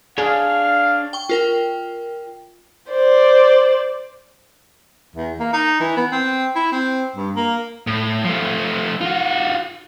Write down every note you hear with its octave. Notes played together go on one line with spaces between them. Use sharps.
D4 G#4 C#5 F5
G5 C#6
F4 A#4 G5
C5 D5
E2
A#3
D#4
E3
B3
C4
E4
C4
G2
A#3
A2
F3 A3
F4 F#4